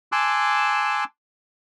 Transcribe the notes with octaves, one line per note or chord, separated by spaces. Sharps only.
G#5 A5 C6 D6 E6 F#6